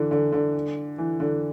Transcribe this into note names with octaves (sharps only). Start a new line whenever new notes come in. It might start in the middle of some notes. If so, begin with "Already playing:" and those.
Already playing: D3 E3
D3
D3
E3
D3